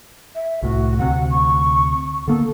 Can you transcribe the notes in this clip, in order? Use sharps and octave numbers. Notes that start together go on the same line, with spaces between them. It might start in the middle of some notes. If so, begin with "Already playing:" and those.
E5
C2 A2 F#4
D2 C3 F#5
C#6
D3 A#3 B3 A4